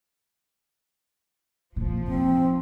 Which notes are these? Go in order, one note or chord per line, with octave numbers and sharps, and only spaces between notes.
F1 A#2 F3
C4 D#4